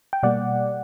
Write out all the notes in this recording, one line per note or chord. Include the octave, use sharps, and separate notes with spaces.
G5
B2 G3 A#3 D5 F#5